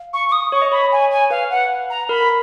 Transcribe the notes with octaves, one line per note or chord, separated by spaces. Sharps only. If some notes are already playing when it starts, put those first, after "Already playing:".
Already playing: F5
C#6
C#6
D#6
C#5 C#6
D#5
C#5 B5
G#5
G#5
B4 F5
F#5
A#5
A#4 B5